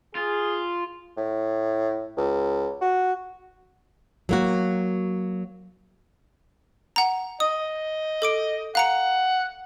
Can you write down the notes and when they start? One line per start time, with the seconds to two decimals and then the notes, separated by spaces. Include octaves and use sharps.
0.15 F4 G#4
1.17 A2
2.17 C#2
2.81 F#4
4.29 F#3 A#3 F#4
6.96 F#5 A#5
7.40 D#5 D#6
8.22 A4 D6 D7
8.75 F5 F#5 A#5 C#7